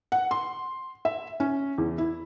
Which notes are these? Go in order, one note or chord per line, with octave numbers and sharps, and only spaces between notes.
F#5
C6
E5
C#4
E2
E4